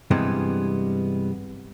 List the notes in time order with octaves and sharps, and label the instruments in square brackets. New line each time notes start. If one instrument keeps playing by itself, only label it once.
[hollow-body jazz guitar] G2 C3 E3 G3 G#3 B3